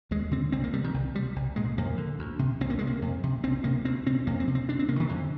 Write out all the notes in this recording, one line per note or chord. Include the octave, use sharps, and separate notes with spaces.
D#2 G#3
D3 C4
C2 C4
A#3
C3 G3
D#3
C2
C3 G3
C2
A#2 G#3
F2 A#3
D3
D2
C3
C2 C4
A#3
C3 G#3
A#3
F2
C3
C2 C4
C3 A#3
D2 C4
C3 C4
F2 A#3
C4
C3
C4
D2 D4
C4
C3 A#3
D#3
F2 D3